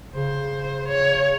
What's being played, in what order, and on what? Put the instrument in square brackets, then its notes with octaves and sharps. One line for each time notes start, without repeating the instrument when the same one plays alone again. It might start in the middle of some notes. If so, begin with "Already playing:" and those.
[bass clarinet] C#3 [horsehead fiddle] C5
[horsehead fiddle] C#5